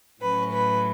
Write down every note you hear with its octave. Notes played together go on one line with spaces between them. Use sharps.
A2 F#3 C#4 B4
B4